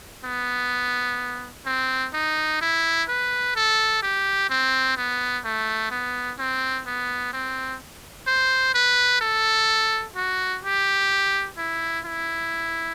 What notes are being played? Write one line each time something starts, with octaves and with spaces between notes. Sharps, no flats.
B3
C4
D#4
E4
B4
A4
G4
C4
B3
A3
B3
C4
B3
C4
C5
B4
A4
F#4
G4
E4
E4